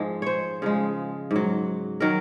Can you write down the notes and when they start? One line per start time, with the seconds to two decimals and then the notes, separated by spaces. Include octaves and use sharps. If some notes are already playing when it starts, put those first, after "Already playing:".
Already playing: G#2 F3 G#3
0.22 C5 C#5
0.62 C#3 F3 G#3
1.31 G#2 F#3
2.00 D#3 F#3 A#4